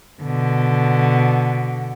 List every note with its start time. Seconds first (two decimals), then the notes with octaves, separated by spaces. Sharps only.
0.22 B2 D3